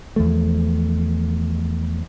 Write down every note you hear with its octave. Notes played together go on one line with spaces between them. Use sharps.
E2 F3 A3